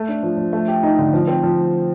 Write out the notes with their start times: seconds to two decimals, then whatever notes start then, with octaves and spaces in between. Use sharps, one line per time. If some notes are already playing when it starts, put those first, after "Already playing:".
Already playing: A3
0.08 D4
0.23 F3
0.37 F3
0.53 A3
0.68 G4
0.83 D#4
0.98 D3
1.14 F3
1.27 C4
1.43 F3